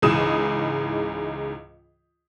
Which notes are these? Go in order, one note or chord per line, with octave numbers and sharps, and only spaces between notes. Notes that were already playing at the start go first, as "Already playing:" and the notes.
C#2 G#2 E3 G#4 D#6 E7